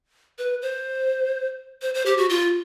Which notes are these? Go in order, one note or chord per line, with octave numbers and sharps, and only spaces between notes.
B4
C5
C5
C5
G4
F#4
F4